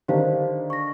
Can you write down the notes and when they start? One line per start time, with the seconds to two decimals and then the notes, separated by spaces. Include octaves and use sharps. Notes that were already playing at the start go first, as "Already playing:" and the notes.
0.08 D3 D#3 D4 G4 C5 F5
0.70 C#6 A#6